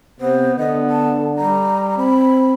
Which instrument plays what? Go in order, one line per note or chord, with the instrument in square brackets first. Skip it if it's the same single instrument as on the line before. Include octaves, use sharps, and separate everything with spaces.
[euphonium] C3 [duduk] B3 [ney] C5
[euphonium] D3 [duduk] B3 [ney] D#5
[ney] A5
[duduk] G3 [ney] A#5
[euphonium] C4 [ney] B5